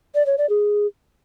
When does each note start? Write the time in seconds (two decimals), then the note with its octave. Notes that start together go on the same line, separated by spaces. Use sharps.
0.15 D5
0.26 C#5
0.38 D5
0.49 G#4